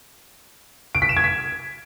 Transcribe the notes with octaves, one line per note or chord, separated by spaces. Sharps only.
D7
B6
E7
G#6
B6